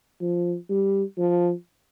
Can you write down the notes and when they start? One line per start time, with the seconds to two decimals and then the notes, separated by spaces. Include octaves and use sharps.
0.21 F3
0.70 G3
1.18 F3